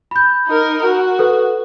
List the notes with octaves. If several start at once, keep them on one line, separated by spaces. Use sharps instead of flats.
B5 G6
D#4 A#4
F#4
A4 B4